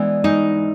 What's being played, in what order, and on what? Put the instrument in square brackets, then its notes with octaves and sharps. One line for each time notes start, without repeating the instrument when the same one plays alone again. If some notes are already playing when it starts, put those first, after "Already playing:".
Already playing: [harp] E3 G#3 B3 D4
[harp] G#2 [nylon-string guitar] D#4